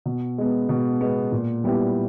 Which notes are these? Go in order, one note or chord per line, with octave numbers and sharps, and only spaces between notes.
B2
G#3 B3
B2
G#3 B3
A#2
G3 B3 E4 G4